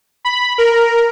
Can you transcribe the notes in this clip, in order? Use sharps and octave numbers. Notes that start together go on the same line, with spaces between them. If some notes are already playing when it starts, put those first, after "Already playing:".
B5
A#4